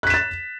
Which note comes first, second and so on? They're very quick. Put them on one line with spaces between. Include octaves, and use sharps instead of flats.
F#6 B6 E7 A6